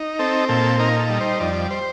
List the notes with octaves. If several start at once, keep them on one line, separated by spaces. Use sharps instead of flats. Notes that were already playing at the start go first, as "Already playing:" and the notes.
Already playing: D#4
C4 A4
A#2 A4
D#4 A#4
A4
G3
C5
F2 D5
C5